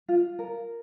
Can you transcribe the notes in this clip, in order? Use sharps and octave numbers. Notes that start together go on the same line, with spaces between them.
F4
A#4